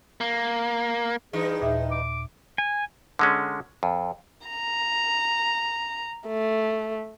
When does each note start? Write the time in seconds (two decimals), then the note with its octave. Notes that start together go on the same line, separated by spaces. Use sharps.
0.21 A#3
1.33 G2 E3 D#4 G#4
1.60 D#2 A#2 E5
1.91 D6
2.58 G#5
3.19 D3 G#3 C#4
3.83 F2
4.47 A#5
6.27 A3